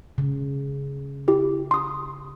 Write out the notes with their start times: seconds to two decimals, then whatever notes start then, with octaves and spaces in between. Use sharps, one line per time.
0.18 C#3
1.28 E4 G4
1.71 C6 D#6